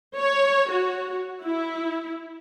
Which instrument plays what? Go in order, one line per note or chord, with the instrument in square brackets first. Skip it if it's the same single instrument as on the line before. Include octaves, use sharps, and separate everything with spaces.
[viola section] C#5
F#4
E4